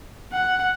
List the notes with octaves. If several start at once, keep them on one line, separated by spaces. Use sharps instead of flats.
F#5